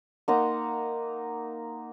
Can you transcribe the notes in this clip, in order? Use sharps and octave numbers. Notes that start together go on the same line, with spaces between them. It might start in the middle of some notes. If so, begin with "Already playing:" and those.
A#3 D#4 F#5 C6